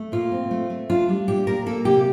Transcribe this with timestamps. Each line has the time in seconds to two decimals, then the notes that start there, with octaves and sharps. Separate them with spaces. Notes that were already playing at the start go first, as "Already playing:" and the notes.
Already playing: A3
0.12 A#2 F4
0.32 C4
0.51 A3
0.70 A3
0.90 D4 F4
1.09 G3
1.28 A#2 G4
1.47 A#2 A#4
1.66 A#3 A4
1.85 C3 G4